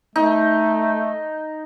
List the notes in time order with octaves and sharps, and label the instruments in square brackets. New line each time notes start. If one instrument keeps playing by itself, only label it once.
[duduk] A3 [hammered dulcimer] D#4